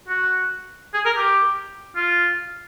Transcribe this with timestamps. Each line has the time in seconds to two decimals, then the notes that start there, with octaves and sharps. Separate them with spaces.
0.08 F#4
0.94 G#4
1.05 A#4
1.16 G4
1.96 F4